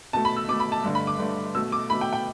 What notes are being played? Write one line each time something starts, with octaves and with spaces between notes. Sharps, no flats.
B2 A3 A5
B5
E6
B2 A3 D6
B5
A5
G2 D3 A3
B5
D6
G2 D3 A3
B2 A3 E6
D6
B2 A3 B5
G5
G5